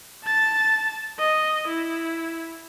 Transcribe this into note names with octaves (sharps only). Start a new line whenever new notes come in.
A5 A6
D#5
E4